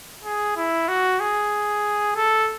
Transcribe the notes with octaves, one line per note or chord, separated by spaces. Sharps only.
G#4
E4
F#4
G#4
A4